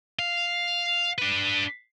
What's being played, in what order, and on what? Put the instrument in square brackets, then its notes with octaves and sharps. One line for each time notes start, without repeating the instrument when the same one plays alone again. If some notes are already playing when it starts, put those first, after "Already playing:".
[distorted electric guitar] F5
D4 B4